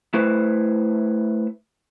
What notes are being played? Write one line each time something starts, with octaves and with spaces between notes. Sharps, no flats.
A3 E4 B4 C5